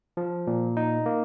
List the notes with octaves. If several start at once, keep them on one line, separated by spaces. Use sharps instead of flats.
F3
A#2
D#4
A#3